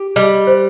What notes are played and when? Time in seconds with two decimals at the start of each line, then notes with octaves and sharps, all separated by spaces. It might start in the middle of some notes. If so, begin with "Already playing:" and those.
Already playing: G4
0.16 G3 D#5
0.47 C5